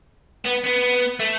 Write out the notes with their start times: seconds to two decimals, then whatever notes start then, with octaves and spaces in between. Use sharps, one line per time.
0.45 B3
0.64 B3
1.20 A3